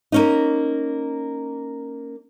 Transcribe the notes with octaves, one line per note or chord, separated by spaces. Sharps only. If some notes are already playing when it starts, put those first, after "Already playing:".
A#3 C#4 D#4